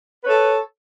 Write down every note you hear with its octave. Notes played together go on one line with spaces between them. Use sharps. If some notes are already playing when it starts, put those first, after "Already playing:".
A4 B4 C#5